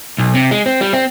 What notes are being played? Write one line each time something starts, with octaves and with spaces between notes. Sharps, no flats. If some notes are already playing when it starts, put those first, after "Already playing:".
B1
C3
G#3
C4
G3
C4